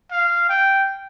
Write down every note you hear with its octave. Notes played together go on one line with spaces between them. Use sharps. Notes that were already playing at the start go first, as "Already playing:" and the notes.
F5
G5